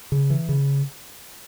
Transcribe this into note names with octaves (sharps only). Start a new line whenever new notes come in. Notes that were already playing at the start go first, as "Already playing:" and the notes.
C#3
E3
C#3